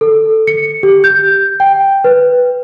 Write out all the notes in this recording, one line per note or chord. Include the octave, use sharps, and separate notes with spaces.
A4
C#7
G4
G6
G5
B4